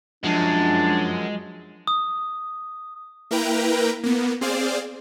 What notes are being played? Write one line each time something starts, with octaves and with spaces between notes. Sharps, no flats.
F#2 F3 G#3 D4
D#6
A#3 E4 A#4 B4 G5 A#5
A#3 B3
C4 G#4 C5 D5 F5